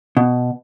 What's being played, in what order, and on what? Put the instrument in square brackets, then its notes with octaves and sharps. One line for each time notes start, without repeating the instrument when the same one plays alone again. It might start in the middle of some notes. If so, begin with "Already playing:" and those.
[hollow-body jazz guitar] B2